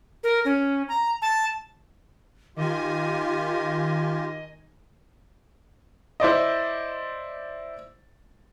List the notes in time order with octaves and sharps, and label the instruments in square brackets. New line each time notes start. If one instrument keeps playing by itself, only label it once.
[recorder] A#4
C#4
A#5
A5
[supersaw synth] D#3 G#5 [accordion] F4 G4 [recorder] D#5
[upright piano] E4 C5 D5 D#5